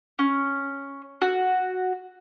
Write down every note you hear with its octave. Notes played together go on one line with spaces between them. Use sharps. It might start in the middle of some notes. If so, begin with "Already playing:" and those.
C#4
F#4